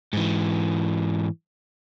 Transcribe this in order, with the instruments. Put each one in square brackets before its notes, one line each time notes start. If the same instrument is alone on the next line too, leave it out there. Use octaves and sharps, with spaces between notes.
[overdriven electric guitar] G#2 E3